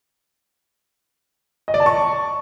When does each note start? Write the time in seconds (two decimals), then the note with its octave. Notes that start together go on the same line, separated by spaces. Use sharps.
1.68 D#5
1.74 D5
1.80 A5
1.86 C#6